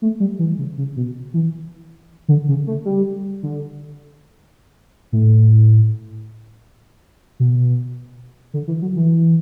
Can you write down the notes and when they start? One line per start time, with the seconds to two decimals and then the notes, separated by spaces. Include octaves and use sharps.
0.02 A3
0.20 G3
0.39 E3
0.58 C#3
0.78 C#3
0.97 B2
1.34 E3
2.28 D3
2.48 C#3
2.67 A3
2.85 G3
3.43 D3
5.12 A2
7.40 B2
8.54 D3
8.67 E3
8.82 F#3
8.96 E3